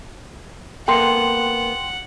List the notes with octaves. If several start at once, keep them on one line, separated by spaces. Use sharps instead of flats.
A#3 B3 A4 F#5 G5 C6